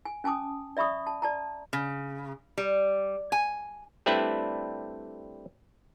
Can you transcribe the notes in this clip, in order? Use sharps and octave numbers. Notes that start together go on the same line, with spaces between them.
G#5
C#4 G#5 A5 D6 D#6
D5 E5 B5 C#6 D#6
A5
D5 A5 A#5
C#3
G3
G#5
G3 A3 C4 D4 E4 B4